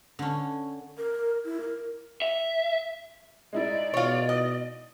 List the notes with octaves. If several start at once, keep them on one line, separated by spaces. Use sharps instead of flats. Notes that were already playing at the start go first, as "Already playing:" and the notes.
D3 C#4
A#4
E4
A#4
E5
G#3 D#4 E4 D5
B2 F4 C#5
D#5